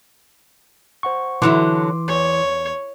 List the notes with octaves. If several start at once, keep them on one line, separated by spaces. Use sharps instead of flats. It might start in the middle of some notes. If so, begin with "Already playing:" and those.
C5 F#5 C#6
D3 E3 F#3 E4 C6 D6
E2 C#5